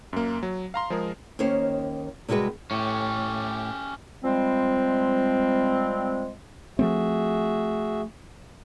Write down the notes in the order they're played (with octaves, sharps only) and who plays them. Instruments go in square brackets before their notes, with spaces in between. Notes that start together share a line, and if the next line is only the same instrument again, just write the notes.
[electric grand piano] F#2 A#3
F#3
F5 A#5 C6
F3 G#3 G#4 A#4
[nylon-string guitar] D#2 D#3 C#4 C5 C#5
C3 G3 G#3 F#4 B4
[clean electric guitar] A2 [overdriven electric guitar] C#4 G4
[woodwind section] F3 G3 G#3 C4
[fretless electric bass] F3 A3 C4 [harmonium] F#4 G#4 E5